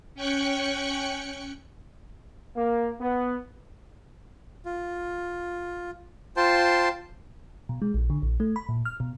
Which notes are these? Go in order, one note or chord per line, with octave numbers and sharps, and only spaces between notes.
C#4 G5 C#6 F#6 C#7
A#3
B3
F4
F4 C5 G5 A5 C6
B2
G#3
A#1
D3
A#1
A3
B5
A#2
F6
B2